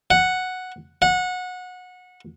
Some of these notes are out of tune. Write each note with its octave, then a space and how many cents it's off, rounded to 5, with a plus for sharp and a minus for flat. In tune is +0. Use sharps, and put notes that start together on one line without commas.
F#5 +0
F#5 -20